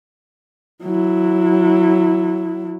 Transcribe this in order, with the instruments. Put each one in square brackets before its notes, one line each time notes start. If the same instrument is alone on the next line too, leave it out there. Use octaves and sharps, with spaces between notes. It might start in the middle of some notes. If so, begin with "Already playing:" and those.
[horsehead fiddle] F#3 E4